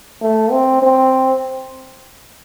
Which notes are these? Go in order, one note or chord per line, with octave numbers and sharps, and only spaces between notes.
A3
C4
C4